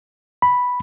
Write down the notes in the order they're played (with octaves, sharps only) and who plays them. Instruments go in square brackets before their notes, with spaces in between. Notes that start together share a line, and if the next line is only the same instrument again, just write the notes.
[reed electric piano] B5